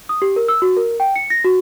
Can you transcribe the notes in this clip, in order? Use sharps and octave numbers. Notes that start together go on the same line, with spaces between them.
D#6
G4
A#4
E6
F#4
A#4
G5
C#7
A#6
F#4